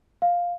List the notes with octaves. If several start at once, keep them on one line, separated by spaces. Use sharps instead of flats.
F5